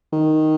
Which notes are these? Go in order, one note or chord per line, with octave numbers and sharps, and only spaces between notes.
D#3